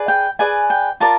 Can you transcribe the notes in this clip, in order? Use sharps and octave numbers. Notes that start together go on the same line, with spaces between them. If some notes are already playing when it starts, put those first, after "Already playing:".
Already playing: G#4 B4 D5
G5
G#4 B4 D5 G#5
G5
F4 A#4 D5 A5